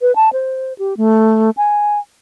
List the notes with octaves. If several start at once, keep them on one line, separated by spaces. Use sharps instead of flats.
B4
A5
C5
G4
A3
G#5